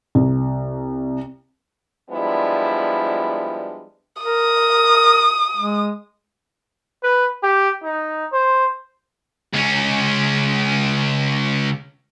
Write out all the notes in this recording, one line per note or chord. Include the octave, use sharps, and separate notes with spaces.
C2
F3 G3 G#3 B3 D4 E4
A#4 D#6
G#3
B4
G4
D#4
C5
C#2 C#4